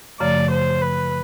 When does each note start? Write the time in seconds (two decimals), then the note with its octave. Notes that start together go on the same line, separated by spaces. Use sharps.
0.20 F#2 C#3 F3 A3 D5
0.51 C5
0.81 B4